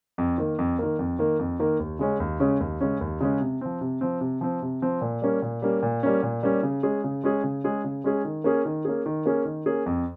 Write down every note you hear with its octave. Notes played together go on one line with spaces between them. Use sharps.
F2
D#3 A#3
F2
D#3 A#3
F2
D#3 A#3
F2
D#3 A#3
D#2
C#3 G#3 C#4
D#2
C#3 G#3 C#4
D#2
C#3 G#3 C#4
D#2
C#3 G#3 C#4
C3
F3 C4
C3
F3 C4
C3
F3 C4
C3
F3 C4
A#2
G3 A#3 C#4
A#2
G3 A#3 C#4
A#2
G3 A#3 C#4
A#2
G3 A#3 C#4
C#3
G#3 C#4 G#4
C#3
G#3 C#4 G#4
C#3
G#3 C#4 G#4
C#3
G#3 C#4 G#4
D#3
A#3 C#4 G#4
D#3
A#3 C#4 G#4
D#3
A#3 C#4 G#4
D#3
A#3 C#4 G#4
F2